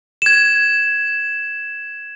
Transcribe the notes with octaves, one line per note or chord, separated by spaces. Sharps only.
G#6 E7